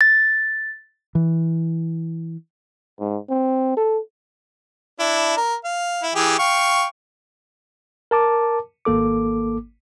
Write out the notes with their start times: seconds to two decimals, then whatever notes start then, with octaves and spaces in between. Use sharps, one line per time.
0.01 A6
1.15 E3
3.00 G#2
3.29 C4
3.77 A4
5.00 D4 E4
5.37 A#4
5.64 F5
6.03 E4
6.15 E3 G4 G#4
6.39 F5 G5 C#6
8.11 A#4 A5 D6
8.85 G#1 A#3 A4 D6